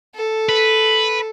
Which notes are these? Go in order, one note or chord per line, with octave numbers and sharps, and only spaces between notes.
A4
B4